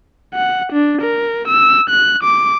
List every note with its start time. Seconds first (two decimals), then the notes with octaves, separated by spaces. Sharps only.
0.34 F#5
0.72 D4
1.01 A#4
1.48 E6
1.90 F#6
2.23 D6